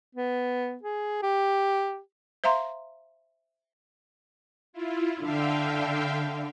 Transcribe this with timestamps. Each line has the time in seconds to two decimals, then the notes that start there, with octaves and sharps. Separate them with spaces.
0.16 B3
0.83 G#4
1.23 G4
2.44 C5 E5 F5 A#5 C6
4.73 E4 F4
5.20 D3 E5 F5 G5